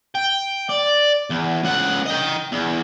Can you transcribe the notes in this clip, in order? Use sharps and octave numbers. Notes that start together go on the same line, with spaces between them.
G5
D5
E2
C#2 F#5
D#5 G5
E2